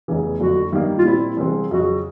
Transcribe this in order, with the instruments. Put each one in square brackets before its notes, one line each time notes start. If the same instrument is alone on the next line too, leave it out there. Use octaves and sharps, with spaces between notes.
[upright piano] F1 E2 C#3 E3
[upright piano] F#1 F2 D3 [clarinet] F#4
[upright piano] G2 D#3 G3 A#3
[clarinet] F4
[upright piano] A#2 G3 C4 [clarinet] E4
[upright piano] C2 C3 E3 G#3 C4
[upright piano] F2 C#3 F#3 [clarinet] F#4